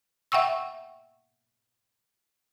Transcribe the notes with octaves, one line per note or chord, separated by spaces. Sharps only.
E5 F#5 G5 C#6 E6